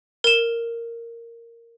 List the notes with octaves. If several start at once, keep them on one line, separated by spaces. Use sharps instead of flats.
A#4 E7